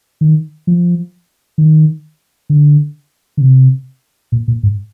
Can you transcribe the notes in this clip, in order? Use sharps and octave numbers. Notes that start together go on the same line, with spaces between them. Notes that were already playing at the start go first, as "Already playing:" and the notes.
D#3
F3
D#3
D3
D3
C3
A#2
A#2
G#2